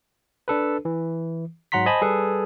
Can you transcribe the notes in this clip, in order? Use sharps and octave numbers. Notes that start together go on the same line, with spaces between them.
D4 A4 B4
E3
G#2 F#3 F#5 A#5 C6 B6
C5 D#5 G#5 A5 B5
G3 G#4 A4 B4